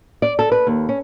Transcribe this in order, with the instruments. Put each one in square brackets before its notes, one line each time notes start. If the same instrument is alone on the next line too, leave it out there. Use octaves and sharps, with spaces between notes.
[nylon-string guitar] D5
A4
B4
D#2
C#4